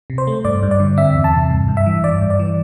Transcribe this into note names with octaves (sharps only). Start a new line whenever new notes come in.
C3
C5
A3
G2 D5
G2
D5
D3
C4 E5
E2
A5
C3
G2
G2
E5
E3
G2 D5
G2
D5
E3